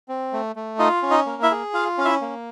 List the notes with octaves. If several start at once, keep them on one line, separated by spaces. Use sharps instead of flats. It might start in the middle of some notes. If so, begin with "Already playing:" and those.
C4
A3
A3
D#4 F4 D#5
C#4
D#4 D#5
A#3
E4 E5
G#4
F4 F5
C#4 F5
E4 E5
A#3